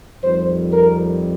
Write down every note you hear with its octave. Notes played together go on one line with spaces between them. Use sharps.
F2 D#3 G3 C4 C5
A#4